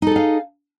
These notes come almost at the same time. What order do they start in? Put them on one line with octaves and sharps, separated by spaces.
D#4 A4 G#4 F5